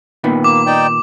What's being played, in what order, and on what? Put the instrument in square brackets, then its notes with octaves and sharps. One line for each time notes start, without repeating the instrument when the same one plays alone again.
[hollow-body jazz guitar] A#2 D#3 B3
[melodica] A#3 [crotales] D6
[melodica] D#4 D5 G5